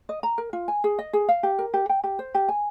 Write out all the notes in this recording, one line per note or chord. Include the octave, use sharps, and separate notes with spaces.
D#5
A#5
A#4
F4
G#5
G#4
D#5
G#4
F5
G4
A#4
G4
G5
G4
C5
G4
G#5